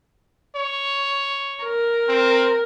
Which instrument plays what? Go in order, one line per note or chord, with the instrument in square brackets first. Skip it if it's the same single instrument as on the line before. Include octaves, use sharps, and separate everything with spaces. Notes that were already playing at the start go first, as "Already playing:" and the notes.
[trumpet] C#5
[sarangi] A#4
[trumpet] C4